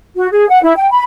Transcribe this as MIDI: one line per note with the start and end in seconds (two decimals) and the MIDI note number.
0.16 0.28 66
0.32 0.47 68
0.49 0.60 78
0.63 0.73 64
0.77 0.90 79
0.91 1.04 83